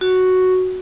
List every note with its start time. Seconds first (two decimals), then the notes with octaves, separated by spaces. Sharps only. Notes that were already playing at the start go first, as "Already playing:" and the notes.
0.01 F#4